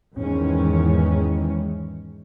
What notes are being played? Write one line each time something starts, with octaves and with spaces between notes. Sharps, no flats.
E2 G#2 D#3 E3 G#3 C#4